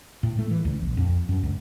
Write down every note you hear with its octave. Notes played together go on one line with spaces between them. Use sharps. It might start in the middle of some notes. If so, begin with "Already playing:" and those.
A2
A3
E3
C#2
A#1
F2
F#2
C#2